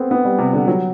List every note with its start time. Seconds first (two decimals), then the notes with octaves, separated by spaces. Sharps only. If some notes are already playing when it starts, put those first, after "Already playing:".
Already playing: A3 B3 C4
0.11 B3
0.25 G3
0.39 C3
0.53 D3
0.67 F#3